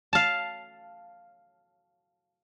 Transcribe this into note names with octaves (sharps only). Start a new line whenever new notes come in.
F5 A5